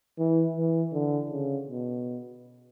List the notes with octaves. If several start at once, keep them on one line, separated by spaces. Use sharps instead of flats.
E3
E3
D3
C#3
B2